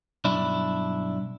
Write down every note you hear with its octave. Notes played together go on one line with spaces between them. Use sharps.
B1 G2 D4 E4